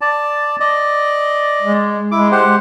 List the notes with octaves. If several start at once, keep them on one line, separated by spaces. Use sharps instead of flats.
D5 A5
D5 D#5
G#3
G#3 E4 D6
G4 C5 F#5